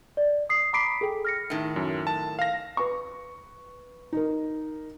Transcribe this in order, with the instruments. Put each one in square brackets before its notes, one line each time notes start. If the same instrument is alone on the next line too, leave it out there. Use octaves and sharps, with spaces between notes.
[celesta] D5
D#6 C7
A#5 B5 D6 B6 C7 D7
G#4 A4 G5
F6 A#6 C#7
[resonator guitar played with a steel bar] A2 D#3
[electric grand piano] F#2
A5
F5 A#6
[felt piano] B4 C#6
D#4 A#4